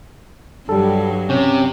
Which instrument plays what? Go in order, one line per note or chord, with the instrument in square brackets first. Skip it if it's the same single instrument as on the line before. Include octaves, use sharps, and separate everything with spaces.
[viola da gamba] G2 F#3 [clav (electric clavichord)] G3 A4
[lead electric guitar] C3 [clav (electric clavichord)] C#4